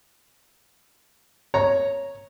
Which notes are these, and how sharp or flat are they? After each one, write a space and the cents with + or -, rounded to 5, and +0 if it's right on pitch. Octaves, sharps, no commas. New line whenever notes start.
C#5 +0 A#5 +0